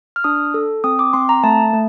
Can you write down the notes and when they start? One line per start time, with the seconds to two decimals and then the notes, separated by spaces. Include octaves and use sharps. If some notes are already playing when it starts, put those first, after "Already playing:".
0.16 F6
0.24 D4 D#6
0.54 A4
0.84 C4 D#6
0.99 D6
1.13 C4 C6
1.29 A#5
1.44 A3 A5
1.73 A3